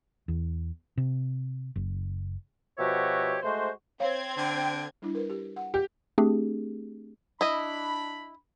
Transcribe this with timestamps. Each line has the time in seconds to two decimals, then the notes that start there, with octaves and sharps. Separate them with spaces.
0.28 E2
0.97 C3
1.76 F#1
2.77 B2 F3 F#4 G4 C#5 E5
3.42 G#3 A3 F#4 C5
4.00 C4 C#5 F5 G#6
4.38 D3 G5
5.02 G3 D4 E4
5.15 A#4 B4
5.30 G4
5.56 F#5
5.74 G4
6.18 A3 C4 D4 G4 G#4
7.41 D4 E4 D#5 B5